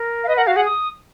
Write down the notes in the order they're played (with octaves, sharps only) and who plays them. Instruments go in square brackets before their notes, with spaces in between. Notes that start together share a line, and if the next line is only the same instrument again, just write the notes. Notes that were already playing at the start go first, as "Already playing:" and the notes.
Already playing: [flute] A#4
[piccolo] F5
[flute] B4 [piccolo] D#5
[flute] A#4 [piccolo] F#5
[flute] F#4 [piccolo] F5
[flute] G#4 [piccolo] F#5
[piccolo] D#6